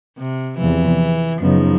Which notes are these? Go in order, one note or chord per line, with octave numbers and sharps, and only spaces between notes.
C3
E2 C3 E3 F3
F#2 C#3 F3 F#3 B3 D#4